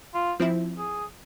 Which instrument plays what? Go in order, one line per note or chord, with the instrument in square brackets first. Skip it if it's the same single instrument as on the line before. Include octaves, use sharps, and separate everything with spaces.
[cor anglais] F4
[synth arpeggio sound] F3 C4 E4
[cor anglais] G#4